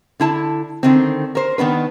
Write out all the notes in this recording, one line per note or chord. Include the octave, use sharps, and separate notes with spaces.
D3 E4 A5
D3 D#3 C4
A#4 C5
D#3 B3 D4 B4